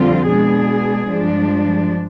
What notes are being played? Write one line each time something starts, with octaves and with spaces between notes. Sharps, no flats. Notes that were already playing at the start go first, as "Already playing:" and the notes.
Already playing: F2 D3 G3 C4 F4
B2 G#3 D4 G#4
G2 F3 G#3 D4